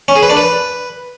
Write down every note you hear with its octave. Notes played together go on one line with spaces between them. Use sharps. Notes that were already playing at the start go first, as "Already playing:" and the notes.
C#4
G#4
B4
D4
B4